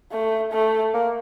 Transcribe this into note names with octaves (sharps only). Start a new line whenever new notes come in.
A3
A3
A#3